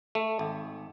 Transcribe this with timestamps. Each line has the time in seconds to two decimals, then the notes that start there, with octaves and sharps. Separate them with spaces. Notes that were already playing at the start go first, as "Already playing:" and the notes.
0.15 A3
0.39 G#1